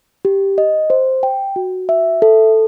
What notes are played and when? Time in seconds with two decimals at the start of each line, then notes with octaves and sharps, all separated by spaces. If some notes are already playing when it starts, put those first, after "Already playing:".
0.25 G4
0.58 D#5
0.90 C5
1.23 G5
1.56 F#4
1.89 E5
2.22 A4